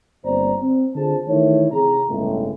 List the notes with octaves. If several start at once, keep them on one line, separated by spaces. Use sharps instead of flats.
G1 A#3 C4 C5 D5 A#5
C4
D3 F4 G#4 C5 A5
D#3 E3 A3 E4 C#5
C3 G#4 A#5
G1 C#2 A2